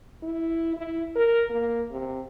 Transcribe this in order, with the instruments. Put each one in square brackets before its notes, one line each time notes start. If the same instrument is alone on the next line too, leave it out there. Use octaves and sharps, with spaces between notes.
[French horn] E4
E4
A#4
A#3
C3